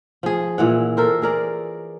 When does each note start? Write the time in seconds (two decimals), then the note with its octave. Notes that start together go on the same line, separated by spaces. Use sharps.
0.23 F3 G#4
0.58 A#2 E3 F#5
0.97 A4 A#4 C5
1.22 G#4 A#4 D5